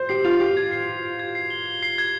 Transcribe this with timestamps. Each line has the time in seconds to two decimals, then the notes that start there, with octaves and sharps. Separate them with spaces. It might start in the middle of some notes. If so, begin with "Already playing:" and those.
Already playing: C5
0.09 G4 C7
0.24 F4 F7
0.40 G4 F7
0.57 G#6
0.71 C7
0.88 C7
1.03 C7
1.19 G#6
1.35 C7
1.50 G7
1.66 G7
1.83 C7
1.98 G#6